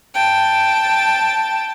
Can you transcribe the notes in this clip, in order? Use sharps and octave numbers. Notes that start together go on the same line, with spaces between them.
G5 A5